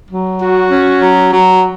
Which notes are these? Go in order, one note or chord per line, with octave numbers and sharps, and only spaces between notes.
F#3
F#4
C#4
F#3
F#3